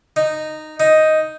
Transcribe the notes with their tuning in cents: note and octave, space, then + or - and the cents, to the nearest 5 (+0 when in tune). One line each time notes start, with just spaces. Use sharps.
D#4 -10
D#4 +5